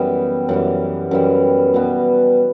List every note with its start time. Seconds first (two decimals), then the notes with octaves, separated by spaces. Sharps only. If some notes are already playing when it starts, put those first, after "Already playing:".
Already playing: F#2 E3 G3 B3
0.49 F#2 E3 G3
1.11 F#2 E3 G3
1.74 B2 G3 B3